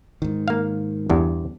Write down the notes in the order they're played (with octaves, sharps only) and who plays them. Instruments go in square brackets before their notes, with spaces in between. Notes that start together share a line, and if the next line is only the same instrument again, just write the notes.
[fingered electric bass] G#2 D#3
[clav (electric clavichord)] A#3 F5
E2 G2